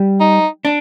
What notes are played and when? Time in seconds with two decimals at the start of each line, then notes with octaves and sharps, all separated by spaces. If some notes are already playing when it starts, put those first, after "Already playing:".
Already playing: G3
0.20 D#4
0.65 D4